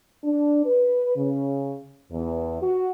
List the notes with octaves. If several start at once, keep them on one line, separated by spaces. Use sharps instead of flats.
D4
B4
C#3
E2
F#4